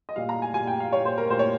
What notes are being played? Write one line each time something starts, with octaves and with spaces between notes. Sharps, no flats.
D#5
A#2 G3 F5
A#5
G#5
A#2 G3 G#5
G5
F5
A#2 G3 C#5
C5
A#4
A#2 G3 C5
C#5